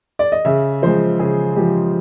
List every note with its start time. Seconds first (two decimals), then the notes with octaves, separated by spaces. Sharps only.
0.19 D5
0.32 D#5
0.45 C#3 E5
0.82 F3 G#3 C5
1.19 C#3 G#4
1.56 F3 G#3 G4